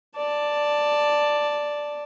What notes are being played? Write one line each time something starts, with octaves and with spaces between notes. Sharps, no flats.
D5 A5